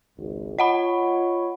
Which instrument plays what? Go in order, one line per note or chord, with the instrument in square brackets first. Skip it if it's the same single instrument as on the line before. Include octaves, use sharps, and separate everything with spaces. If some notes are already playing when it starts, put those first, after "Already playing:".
[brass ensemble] G#1 C#2
[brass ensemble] F4 C#5 [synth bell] D#5 F#5 B5